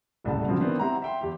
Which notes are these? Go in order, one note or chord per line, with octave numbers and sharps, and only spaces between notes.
D#1 C2 A2 C#3 F#5 A5
C#3 F3 F#3 C4
D#3 E3 B3 C4 D4
C4 E4 G4 F#5 A#5
E5 G5 C6
E2 G4